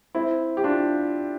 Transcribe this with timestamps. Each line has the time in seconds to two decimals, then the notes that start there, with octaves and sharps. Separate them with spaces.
0.15 C4 E4
0.57 G4
0.64 D4 F4